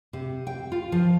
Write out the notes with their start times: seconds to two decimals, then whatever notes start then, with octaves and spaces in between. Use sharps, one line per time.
0.13 C3
0.47 G5
0.72 F4
0.92 F3